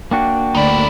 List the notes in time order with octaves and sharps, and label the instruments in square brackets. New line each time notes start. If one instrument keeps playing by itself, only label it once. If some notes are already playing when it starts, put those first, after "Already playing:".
[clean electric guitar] A#3 D4 F#4 [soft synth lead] G5
[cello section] D2 D5 [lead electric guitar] D#4 E4